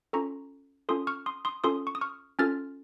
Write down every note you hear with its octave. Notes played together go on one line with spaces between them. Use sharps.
C#4 F4 A4 A#5 C#6
C#4 F4 A4 C6 D#6
C#6 F6
C6 D#6
C6 D#6
C#4 F4 A4 C6 D#6
C#6
D#6
C#6 F6
C#4 F4 A4 F6 A6